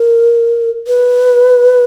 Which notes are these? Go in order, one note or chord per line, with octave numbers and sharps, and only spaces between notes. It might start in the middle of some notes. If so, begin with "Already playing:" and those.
Already playing: A#4
B4